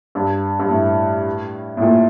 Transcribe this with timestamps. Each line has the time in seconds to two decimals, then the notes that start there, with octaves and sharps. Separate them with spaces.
0.15 G2
0.60 G2
0.70 A2
1.77 A2
1.82 A#2